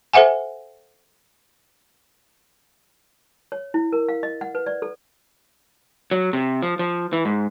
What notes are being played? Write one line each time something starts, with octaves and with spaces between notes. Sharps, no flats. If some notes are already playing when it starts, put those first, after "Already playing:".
A4 C5 E5 F#5 G#5
C#5
E4
A#4
F5
D#5
F#5
B4
D5
A4
F#3
C3
F3
F3
E3
G#2